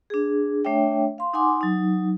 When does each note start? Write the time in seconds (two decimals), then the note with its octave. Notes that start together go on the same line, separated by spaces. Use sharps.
0.10 D4 G#4
0.65 A3 D4 C#5 E5 G5
1.18 F5 C6
1.33 D#4 F#5 G#5 C6 D6
1.61 F#3 D#4